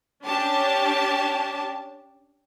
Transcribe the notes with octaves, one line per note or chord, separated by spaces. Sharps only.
C#4 D4 G4 A5